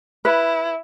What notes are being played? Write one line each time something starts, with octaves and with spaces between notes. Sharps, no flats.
E4 B4